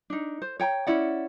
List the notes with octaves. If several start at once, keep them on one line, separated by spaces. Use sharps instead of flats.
D4 D#4
C5
C#5 G5 G#5 A#5
C#4 E4 D5 F#5